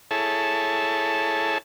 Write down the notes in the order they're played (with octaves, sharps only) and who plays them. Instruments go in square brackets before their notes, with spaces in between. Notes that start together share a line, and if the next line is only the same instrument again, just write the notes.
[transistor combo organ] E4 G#4 A4 C#5 A5